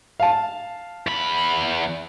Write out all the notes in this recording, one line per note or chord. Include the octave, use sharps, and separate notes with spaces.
F5 A5
E2 B5